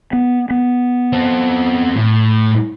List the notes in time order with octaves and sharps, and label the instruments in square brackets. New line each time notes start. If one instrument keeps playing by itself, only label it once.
[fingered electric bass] B3
B3
[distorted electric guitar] C4 A4
A2